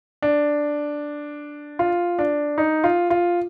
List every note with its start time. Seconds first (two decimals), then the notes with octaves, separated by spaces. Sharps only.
0.22 D4
1.79 F4
2.19 D4
2.58 D#4
2.84 F4
3.10 F4